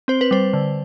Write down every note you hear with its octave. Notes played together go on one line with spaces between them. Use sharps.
C4 C5
B4
G3 C5
D3